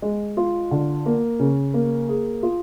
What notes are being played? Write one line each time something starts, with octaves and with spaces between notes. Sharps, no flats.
G#3
F4
D3
A#3
C#3
A#3
G#4
F4